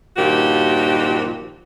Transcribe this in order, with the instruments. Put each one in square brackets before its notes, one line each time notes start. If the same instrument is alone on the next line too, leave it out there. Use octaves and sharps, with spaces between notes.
[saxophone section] G2 A#2 D#3 F3 F#4 G4